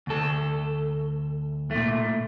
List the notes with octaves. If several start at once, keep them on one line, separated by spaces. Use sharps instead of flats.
D2 A4
A#2 A3